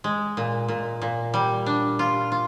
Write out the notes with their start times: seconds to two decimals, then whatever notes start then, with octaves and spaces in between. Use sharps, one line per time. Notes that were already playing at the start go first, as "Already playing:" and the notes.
0.04 G#3
0.37 A#2
0.68 A#2
1.02 A#2
1.34 G3
1.66 D4
1.99 F4
2.32 F4